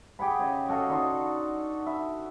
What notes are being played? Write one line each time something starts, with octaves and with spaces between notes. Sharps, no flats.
G4 G#4 F#5 B5
C#3 C#5 D#5
F#4 A4 D#5 F5
D4 D#4 F#5 C6
E5 B5